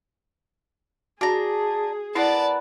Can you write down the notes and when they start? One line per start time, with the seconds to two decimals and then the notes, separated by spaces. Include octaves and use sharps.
1.21 D4 F#4 G#4 A#5
2.15 B3 E4 A#4 B4 D5 A5